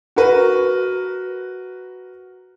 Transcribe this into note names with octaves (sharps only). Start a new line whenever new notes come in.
F#4 A#4 B4